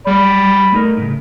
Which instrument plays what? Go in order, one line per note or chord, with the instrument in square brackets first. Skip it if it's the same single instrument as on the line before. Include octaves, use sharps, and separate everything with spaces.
[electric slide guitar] G3 [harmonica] D5 B5
[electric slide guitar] A3 D#4 A#4
A2 C#3